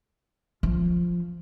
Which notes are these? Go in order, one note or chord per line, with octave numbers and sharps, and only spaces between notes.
F3